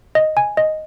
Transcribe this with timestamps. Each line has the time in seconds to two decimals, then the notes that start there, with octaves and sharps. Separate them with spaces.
0.15 D#5
0.37 G#5
0.57 D#5